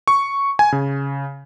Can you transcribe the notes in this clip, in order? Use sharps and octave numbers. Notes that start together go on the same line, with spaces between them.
C#6
G#5
C#3